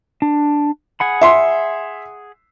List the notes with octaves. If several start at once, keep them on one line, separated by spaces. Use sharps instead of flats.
D4
G#4 F#5 B5
E5 C6